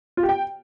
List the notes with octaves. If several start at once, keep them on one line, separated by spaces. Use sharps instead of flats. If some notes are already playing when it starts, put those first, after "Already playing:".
F4
G4
G5